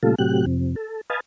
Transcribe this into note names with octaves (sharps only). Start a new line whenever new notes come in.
A#2 C#3 G3 A3 F4 A4
A2 C3 F#3 G4 F#6
F2 C3
A4
B4 D#5 F5 G#5 A5